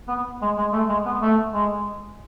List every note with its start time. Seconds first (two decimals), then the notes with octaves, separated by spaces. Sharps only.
0.08 B3
0.41 G#3
0.58 G#3
0.73 A3
0.89 G#3
1.05 B3
1.22 A3
1.54 G#3